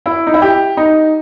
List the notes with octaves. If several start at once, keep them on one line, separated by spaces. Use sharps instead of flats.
E4
D#4
E4
G4
D#4